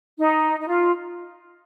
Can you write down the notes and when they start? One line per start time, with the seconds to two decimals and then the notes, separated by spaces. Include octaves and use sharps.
0.19 D#4
0.60 D#4
0.69 F4